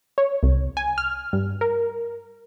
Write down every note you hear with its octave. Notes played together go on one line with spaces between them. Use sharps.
C#5
C2
G#5
F6
G2
A#4